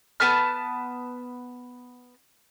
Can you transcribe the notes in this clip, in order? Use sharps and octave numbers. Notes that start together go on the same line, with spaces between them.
B3 B4 A5 F6